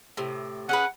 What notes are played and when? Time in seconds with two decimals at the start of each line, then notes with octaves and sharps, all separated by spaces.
0.17 A2 C3
0.69 C#4 G#4 B4 F#5